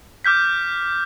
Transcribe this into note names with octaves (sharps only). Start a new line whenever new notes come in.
D6 F6 G6 B6